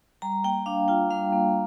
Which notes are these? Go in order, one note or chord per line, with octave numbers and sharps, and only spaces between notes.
G3 A#5
A#3 G5
D4 F5
F4 G5
G3 F5
A#3